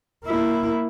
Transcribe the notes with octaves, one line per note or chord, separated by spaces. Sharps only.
A#3 E4